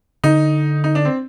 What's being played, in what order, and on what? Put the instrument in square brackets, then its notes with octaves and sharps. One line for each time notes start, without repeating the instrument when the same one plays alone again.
[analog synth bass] D3 [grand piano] D#4
[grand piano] D#4
D4
C4